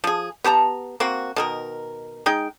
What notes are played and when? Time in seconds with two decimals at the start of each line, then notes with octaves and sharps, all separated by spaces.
0.04 F3 G#4
0.44 B3 G4 A5 A#5
1.00 A#3 C4 F#4
1.36 B2 D#3 A#4
2.26 G#3 D#4 G5